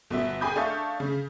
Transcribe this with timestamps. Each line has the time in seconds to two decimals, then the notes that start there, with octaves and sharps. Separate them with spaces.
0.10 G1 B2 E5
0.41 G#4 G5 G#5 B5 D#6 G6
0.56 D4 A4 E5 F5 C#6 G6
1.00 C#3